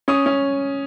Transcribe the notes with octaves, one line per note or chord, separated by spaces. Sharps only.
C#4 D#6
C#4